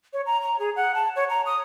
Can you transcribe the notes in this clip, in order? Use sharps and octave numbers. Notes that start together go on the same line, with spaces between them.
C#5
A#5
A#5
G#4
F#5
A5
C#5
A#5
D#6